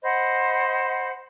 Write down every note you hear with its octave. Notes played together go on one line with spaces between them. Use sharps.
C5 D#5 F#5 B5